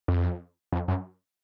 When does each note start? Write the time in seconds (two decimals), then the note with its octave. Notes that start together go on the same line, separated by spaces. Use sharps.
0.08 F2
0.72 F2
0.88 F#2